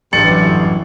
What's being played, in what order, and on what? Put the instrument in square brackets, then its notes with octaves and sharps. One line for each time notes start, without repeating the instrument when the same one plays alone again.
[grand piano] A1 C#7 F#7 [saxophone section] G2 D3 [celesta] A6
[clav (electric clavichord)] F#2 E3